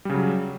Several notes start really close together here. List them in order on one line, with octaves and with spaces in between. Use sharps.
G3 C#3 F#3